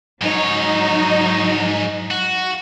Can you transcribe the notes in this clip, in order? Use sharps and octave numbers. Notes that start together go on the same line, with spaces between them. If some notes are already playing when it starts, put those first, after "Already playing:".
G#2 F#3 D#4 C#5
F#4